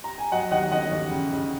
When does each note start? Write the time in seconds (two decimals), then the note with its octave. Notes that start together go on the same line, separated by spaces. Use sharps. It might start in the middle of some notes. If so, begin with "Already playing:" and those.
0.04 A#5
0.18 G#5
0.32 F#3 D#5 F#5
0.51 D#2 D#5 F#5
0.71 D#2 D#5 F#5
0.91 D#2
1.11 C#3
1.32 C#3